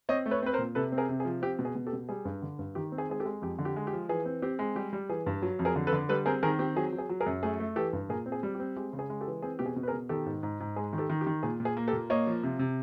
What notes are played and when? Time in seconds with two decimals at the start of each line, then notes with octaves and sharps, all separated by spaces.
0.09 C4 C#5 D#5
0.26 A3
0.31 B4 C#5
0.42 C4 B4
0.53 A#4 C5
0.58 A#2
0.75 C3 A4 B4
0.92 C4
0.98 G#4 A#4
1.09 C3
1.20 G#4
1.25 F3
1.42 C4 G4
1.59 B2
1.65 G#4
1.75 B2
1.86 G4 A4
1.93 B2
2.09 G3 G#4
2.25 G2
2.42 D3
2.59 G2
2.75 D#3 G4
2.92 C4
2.98 G#4
3.09 G#3 G#4
3.20 G4 A4
3.25 G#3
3.42 F2 G4
3.59 D3
3.65 G4
3.76 G#3
3.87 G4
3.93 F3
4.09 E3 G#4
4.25 C4
4.42 C4 G4
4.59 G#3
4.75 G3 G4
4.93 G3
5.10 E3 G#4
5.26 G2
5.42 F#3
5.59 F2
5.65 G#4 A#4
5.76 D3
5.87 A4 B4
5.93 D3
6.09 G3 A4 B4
6.26 C4 G#4 A#4
6.43 D#3 G#4 A#4
6.59 C4 G4
6.76 F#3 G#4
6.93 F#3
6.98 G#4
7.09 F#3
7.20 G#4 A#4
7.26 F#2
7.43 A3 G#4
7.60 A3
7.76 E3 G4 A4
7.93 G2
8.09 A#2 G#4 A#4
8.26 C4
8.32 G#4
8.43 G3
8.55 G4
8.59 C4
8.76 G#3 G4
8.93 C#3
8.99 G#4
9.10 G#3
9.21 G4 A4
9.27 E3
9.42 C4 G#4
9.59 B2 G4
9.66 G#4
9.76 B2
9.83 B4
9.88 G#4 A#4
9.93 B2
10.09 D#3 G4 A4
10.26 G#2
10.43 G#2
10.60 G#2
10.76 G#3 G#4
10.93 D#3
10.98 G4 A4
11.10 D#3
11.21 G4
11.27 D#3
11.43 A#2 G#4
11.60 A#2
11.65 G#4
11.77 A#3
11.88 G4 A4
11.93 A#2
12.10 A#3 C#5 D#5
12.27 F3
12.43 C3
12.59 C3